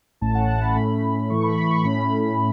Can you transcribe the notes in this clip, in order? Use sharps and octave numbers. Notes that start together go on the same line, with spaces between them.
A1 A2 A3 C#4 A5
F#5
A5
B5
A2 A3 C#4
A2 E3 A3 C#6
B5
B5
C#6
A2 A3 C#4 B5